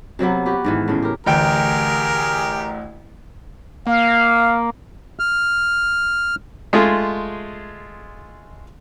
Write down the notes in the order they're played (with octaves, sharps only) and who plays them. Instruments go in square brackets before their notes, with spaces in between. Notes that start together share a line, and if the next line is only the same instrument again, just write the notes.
[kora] C3 F#3 A#3 B3
F#4 G4 B4
G#2 D#3 E3
A2 C#3 G#3
G4 A#4
[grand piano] A1 D2 G5 [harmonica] G4 G#4 A#4
[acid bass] A#3 [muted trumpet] F5
[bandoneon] F6
[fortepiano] G#3 A3 F4 G#4